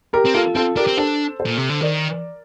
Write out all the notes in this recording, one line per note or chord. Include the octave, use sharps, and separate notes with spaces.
G4 A#4
C4
A#3 F4 A4
C4 F4 A4
D4 G4 A#4
C4
D4 A4 C5
A4 C5
A#2
C3
D3
D#3 A#4 D5